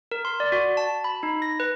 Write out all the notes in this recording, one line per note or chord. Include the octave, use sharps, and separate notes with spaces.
A#4
C6
D5
F#4
A5
B5
D#4
A#6
B4